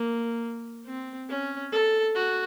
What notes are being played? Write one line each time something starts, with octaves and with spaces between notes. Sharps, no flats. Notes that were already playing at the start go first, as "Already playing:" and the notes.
Already playing: A#3
C4
C#4
A4
F#4